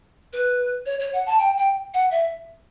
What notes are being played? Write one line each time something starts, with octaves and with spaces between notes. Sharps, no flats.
B4
C#5
C#5
F#5
A5
G5
G5
F#5
E5